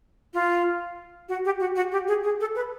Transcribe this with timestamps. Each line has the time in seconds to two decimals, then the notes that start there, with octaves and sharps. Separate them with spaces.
0.34 F4
1.29 F#4
1.45 G4
1.60 F#4
1.76 F#4
1.92 G4
2.08 G#4
2.23 G#4
2.41 A4
2.55 B4